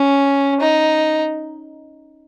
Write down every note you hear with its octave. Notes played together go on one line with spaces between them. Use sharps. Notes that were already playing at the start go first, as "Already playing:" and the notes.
Already playing: C#4
D#4